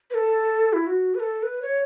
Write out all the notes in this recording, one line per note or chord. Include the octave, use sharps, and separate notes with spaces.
B4
A4
E4
F#4
B4
A4
B4
C#5